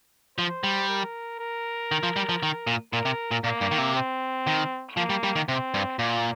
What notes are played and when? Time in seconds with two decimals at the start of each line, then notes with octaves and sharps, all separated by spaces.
0.38 F3 C5
0.64 G3
0.89 A#4
1.39 A#4
1.92 D#3
2.03 F3
2.16 G3
2.29 F3
2.43 D#3
2.67 A#2
2.93 A#2 A#4
3.05 C3
3.31 A#2
3.44 A#2 A#3
3.61 G2
3.71 D#3
3.78 C3
3.95 C4
4.47 D#3
4.97 F3 A#3
5.10 G3
5.24 G3
5.36 D#3
5.49 C3 C4
5.74 G2
5.99 A#2 A#3